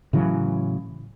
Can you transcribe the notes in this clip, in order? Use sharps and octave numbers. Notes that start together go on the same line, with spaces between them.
A2 C#3 E3 F#3